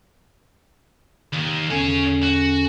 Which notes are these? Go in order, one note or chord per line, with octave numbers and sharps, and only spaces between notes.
D#2 D#3
E2 D3 C#4 G#4 C#5
F#4